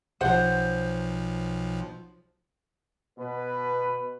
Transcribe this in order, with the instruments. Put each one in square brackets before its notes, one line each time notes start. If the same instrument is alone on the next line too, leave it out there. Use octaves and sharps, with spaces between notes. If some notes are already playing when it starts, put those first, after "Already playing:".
[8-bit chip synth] B1 F3 [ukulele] C5 F#5
[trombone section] B2 B4